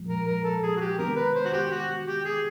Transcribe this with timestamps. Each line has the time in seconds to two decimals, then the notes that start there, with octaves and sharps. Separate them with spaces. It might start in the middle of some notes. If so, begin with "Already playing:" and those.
Already playing: A#2 F3 G#3
0.08 A#4
0.27 A#4
0.44 A4
0.63 G#4
0.76 F#4
0.81 G4
0.98 C3 D#3 G#3 B3 D4 A#4
1.16 B4
1.35 C5
1.45 F#4
1.53 G4
1.71 F#4
2.07 G4
2.25 G#4